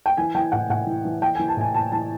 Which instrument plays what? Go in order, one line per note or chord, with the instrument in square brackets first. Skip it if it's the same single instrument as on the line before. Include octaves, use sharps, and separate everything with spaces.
[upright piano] G5
E3 G#5
E3 G5
A2 F#5
A2 F#5
E3
E3
E3 G5
E3 G#5
A5
A2 G#5
A2 A5
E3 A5